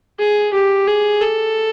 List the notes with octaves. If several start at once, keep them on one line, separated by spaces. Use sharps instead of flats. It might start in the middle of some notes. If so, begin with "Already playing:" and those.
G#4
G4
G#4
A4